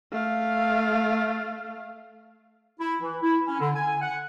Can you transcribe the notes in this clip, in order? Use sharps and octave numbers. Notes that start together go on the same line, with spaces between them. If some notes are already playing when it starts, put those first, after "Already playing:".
A3 F5
E4
E3
E4
C#4
D3
G#5
F#5